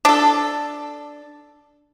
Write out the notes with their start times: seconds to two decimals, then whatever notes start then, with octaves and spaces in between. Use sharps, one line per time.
0.05 D4 A4